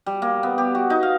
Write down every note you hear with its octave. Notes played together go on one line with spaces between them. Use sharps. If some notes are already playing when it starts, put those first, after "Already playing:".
G3
A#3
B3
G4
F#4
D#4
F5